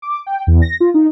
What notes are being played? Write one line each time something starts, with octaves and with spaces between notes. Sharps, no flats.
D6
G5
E2
A#6
F4
D#4